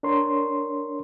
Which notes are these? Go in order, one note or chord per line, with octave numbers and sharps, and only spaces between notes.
D4 A#4 C#5 C6